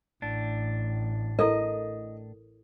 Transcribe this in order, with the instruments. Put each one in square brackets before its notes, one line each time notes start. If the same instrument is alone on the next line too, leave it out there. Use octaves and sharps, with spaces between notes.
[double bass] A1 [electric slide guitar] A2 D4
[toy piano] E4 A4 A#4 [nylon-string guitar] D#5